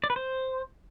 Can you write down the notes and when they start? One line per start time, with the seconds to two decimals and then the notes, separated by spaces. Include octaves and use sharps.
0.04 D5
0.10 B4
0.16 C5